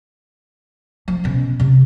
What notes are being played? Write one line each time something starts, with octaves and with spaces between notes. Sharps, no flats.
F3
B2 C#4
C3